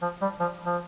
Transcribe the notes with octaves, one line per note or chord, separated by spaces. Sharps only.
F3
G3
F3
F3